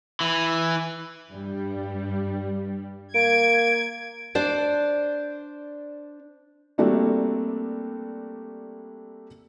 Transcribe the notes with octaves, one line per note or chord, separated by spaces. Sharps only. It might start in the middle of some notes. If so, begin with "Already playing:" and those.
E3
G2 G3
A#3 G#6 D7
D4 C5 D5
G3 A3 A#3 C4 D4 F#4